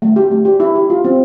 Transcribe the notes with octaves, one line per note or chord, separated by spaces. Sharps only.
A3
G4
A3
G4
E4
G4
F4
C4